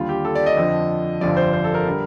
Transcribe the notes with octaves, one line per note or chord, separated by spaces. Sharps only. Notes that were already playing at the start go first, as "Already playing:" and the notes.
Already playing: D#2 D3 G3 F4
G4
A4
D5
D#5
F2 D3 F3
G1 F2 D3 F3 D5
C5
C5
A4
A#4
D3 G3